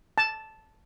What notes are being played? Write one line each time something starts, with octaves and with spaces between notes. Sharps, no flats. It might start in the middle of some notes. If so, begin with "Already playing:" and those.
A5